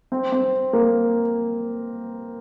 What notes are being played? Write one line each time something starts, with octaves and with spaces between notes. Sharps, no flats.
C4
C4
A#3